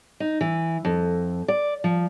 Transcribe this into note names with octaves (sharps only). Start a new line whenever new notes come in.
D#4
E3
F2
D5
F3